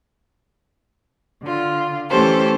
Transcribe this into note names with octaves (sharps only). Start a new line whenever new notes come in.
D3 F4
E3 A3 C#4 G4 A4 C5